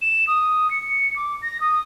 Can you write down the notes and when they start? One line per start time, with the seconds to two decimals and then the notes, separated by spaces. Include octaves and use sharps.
0.02 E7
0.27 D#6
0.71 C#7
1.16 D6
1.42 A#6
1.60 D#6